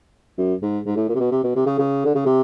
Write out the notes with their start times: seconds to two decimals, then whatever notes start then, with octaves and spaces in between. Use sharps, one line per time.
0.38 F#2
0.62 G#2
0.86 G#2
0.96 A2
1.09 A#2
1.15 C3
1.20 B2
1.32 C3
1.43 B2
1.56 C3
1.66 C#3
1.78 C#3
2.05 D3
2.15 C#3
2.26 C3